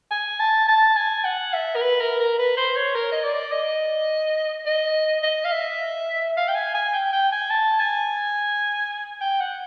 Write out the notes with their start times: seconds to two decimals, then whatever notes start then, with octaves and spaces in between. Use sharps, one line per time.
0.11 G#5
0.40 A5
0.68 A5
0.97 G#5
1.25 F#5
1.54 E5
1.76 A#4
1.82 B4
2.01 A#4
2.20 A#4
2.39 B4
2.57 C5
2.77 C#5
2.95 A#4
3.12 D#5
3.24 D5
3.52 D#5
4.66 D#5
5.23 D#5
5.45 F5
5.52 E5
6.37 F5
6.48 G5
6.55 G#5
6.75 G#5
6.94 G5
7.13 G5
7.32 G#5
7.50 A5
7.80 G#5
9.21 G5
9.40 F#5